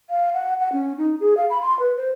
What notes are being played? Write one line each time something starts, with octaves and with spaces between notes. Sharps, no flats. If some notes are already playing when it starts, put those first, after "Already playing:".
F5
F#5
F#5
C#4
D#4
G#4
F5
B5
C6
B4
C5